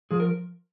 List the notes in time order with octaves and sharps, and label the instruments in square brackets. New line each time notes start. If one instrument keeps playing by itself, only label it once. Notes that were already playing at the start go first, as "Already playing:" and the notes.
[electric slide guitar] F3 G#4
A#4